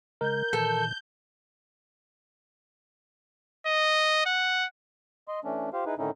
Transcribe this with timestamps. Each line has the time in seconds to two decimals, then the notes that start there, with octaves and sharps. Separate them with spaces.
0.21 C#3 G#3 A#4 G6
0.53 A#2 D#3 E3 A4
3.67 D#5
4.26 F#5
5.28 D#5 C6
5.45 E3 A3 C#4 D4
5.73 F4 G4 C5 F5
5.86 D#4 E4 G#4 B4
5.98 A2 D3 D#3 C#4 D#4 E4